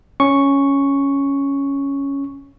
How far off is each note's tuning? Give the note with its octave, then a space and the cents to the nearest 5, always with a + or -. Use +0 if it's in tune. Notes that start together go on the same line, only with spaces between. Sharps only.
C#4 +0 C#6 +0